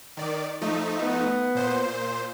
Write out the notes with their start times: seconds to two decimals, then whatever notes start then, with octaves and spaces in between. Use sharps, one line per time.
0.17 D#3 D5
0.61 F3 A3 D#4
1.01 B3
1.55 A#2 C5